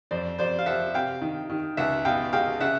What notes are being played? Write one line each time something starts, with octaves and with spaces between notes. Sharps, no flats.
F2 C5 D5
F2 C5 D5
F5
F3 E5 F#5
C3 F5 G5
D#3
D#3
C#2 E5 F#5
B2 F5 G5
G#3 F5 G5
C#3 E5 F#5